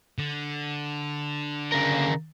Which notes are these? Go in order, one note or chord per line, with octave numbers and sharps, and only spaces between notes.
D3
C#3 A#4